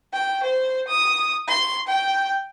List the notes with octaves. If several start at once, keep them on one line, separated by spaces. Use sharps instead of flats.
G5
C5
D#6
C6
G5